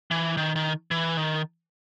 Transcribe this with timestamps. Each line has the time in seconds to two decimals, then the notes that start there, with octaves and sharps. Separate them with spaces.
0.11 E3
0.37 D#3
0.56 D#3
0.91 E3
1.17 D#3